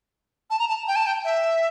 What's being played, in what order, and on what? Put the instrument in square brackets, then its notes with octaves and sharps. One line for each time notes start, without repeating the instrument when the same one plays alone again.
[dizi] A5
A#5
A5
G5
A5
G5
E5